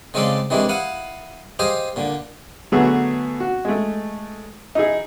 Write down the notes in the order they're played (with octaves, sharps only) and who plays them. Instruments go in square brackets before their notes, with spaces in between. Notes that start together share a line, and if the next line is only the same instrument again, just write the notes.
[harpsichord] C#3 G#3 C4 F4 A4 D5
C3 D#3 E3 G#3 D4 E4
E4 F5 F#5 D#6
G4 G#4 C5 D#5 F5
A#2 D3
[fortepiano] D3 F#3 A3 B3 F#4 G#4
F#4
G#3 A3
D#4 E4 G#4